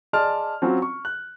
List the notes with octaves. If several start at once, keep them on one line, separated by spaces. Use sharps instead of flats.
G#4 D5 D#5 A5 C6 F6
F#3 C4 C#4 F4
C#6
F#6